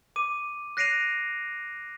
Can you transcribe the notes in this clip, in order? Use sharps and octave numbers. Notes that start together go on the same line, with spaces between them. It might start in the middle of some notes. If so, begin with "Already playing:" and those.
D6 D#7
F#6 A#6 C7 D7 D#7 F7